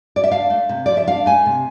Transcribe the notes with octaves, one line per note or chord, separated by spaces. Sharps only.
D5
E5
D4 F5
A3
C3
F3 D5
E5
D4 F5
A3 G#5
C3